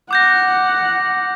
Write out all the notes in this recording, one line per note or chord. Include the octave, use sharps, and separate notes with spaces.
F#5 D6 G6 A#6